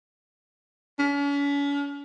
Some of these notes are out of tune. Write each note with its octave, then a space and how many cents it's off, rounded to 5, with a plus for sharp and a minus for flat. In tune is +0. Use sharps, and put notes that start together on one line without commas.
C#4 +45